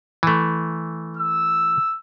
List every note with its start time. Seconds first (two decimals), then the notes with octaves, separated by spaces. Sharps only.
0.23 E3 A3
1.17 E6